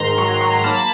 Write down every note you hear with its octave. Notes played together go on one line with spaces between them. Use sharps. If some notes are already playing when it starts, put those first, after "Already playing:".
Already playing: G#2 D#3 A#5 C6
F#3
F#3
A#5
A#3 A5 B5